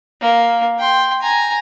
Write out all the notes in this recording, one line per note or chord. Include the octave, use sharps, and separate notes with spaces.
A#3
G5 C6
G#5 A#5